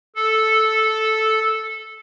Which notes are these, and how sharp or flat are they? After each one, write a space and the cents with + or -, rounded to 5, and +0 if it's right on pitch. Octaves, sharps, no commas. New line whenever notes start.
A4 -5